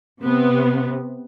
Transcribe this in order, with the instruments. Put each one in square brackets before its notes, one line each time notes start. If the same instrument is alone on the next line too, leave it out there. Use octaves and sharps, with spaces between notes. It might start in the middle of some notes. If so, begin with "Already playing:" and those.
[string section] C3 B3